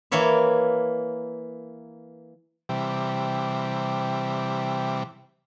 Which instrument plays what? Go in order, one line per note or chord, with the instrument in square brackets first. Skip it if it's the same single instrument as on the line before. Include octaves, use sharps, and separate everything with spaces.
[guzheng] E3 A#3 A#4 C#5 E5
[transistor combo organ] C3 E3 G3